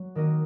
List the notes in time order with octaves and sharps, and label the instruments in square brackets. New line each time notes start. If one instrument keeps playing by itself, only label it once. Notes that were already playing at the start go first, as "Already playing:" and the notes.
Already playing: [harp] F#3
D#3 A#3 F#4 D#5